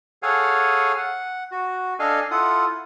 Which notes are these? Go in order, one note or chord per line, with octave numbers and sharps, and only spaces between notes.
G#4 A4 C#5 F5 F#5 G#5
F#5
F#4
D4 A4 D#5 F5 G#5
E4 F4 A4 F#5 D#6